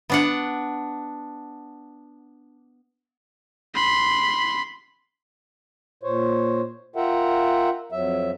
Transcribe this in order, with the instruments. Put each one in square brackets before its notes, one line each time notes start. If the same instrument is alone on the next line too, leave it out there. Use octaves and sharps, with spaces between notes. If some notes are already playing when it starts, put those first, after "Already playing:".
[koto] B3 D4 F#5
[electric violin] B5 C6
[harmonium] A#2 C5 C#5
F4 A#4 E5 F#5 G5
F2 F#3 E5